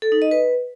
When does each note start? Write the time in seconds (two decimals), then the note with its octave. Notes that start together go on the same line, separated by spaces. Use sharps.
0.02 A4
0.12 D#4
0.22 D#5
0.31 B4